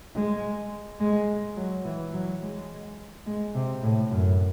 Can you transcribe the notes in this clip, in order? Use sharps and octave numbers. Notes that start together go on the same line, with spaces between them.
G#3
G#3
F#3
E3
F#3
G#3
G#3
C3
A2
F#2